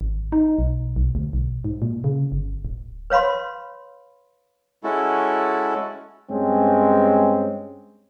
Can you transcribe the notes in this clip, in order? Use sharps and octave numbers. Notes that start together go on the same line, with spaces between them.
G#1
D#4
B1
B1
D2
B1
G#2
A#2
C#3
G1
D1
B4 C#5 F5 B5 C6
G#3 C#4 E4 F#4 A4
G2 G#3 C4 C#4